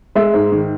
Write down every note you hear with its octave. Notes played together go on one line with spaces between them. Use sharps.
G#3 E5
G#2
D#3